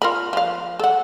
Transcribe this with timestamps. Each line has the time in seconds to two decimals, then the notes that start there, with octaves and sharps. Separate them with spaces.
0.02 F4 A#4 B5
0.33 F3 F5
0.79 A4 F#5